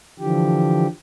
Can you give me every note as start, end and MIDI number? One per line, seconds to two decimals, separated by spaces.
0.20 0.87 50
0.20 0.87 52
0.20 0.87 53
0.20 0.87 67